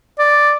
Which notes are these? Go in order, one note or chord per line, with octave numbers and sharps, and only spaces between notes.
D5